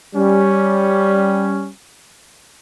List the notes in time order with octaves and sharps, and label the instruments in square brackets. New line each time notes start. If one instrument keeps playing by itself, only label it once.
[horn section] G3 C#4